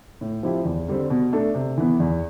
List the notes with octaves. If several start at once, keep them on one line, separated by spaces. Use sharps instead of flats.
A2
F3 C4 E4 G4
E2
D3 G3 C4
B2
A3 D4 A4
C3
E3 B3
E2